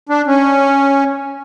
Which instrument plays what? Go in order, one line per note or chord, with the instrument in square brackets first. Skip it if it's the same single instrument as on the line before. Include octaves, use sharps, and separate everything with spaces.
[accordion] D4
C#4